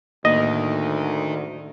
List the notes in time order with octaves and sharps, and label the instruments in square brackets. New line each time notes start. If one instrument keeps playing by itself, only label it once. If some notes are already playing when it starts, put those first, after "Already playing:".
[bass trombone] D2 [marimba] A2 A#3 D#4 [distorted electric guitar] D#3 [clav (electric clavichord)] D#5